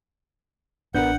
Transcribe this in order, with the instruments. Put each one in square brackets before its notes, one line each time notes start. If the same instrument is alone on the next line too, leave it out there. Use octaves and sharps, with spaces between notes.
[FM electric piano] A1 D4 G6 [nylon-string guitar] B3 A#4 [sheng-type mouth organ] F#5